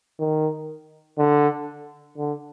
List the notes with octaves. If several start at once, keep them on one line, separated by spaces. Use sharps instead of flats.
D#3
D3
D3